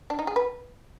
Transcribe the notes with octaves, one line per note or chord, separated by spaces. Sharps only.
D4
D#4
G#4
B4